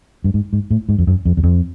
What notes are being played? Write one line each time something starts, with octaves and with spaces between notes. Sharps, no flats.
G2
G#2
G#2
A2
G#2
F2
F#2
F2
E2
F2